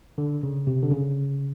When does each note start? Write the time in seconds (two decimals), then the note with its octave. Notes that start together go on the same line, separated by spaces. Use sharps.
0.18 D3
0.43 C#3
0.67 C3
0.83 D3
0.92 C#3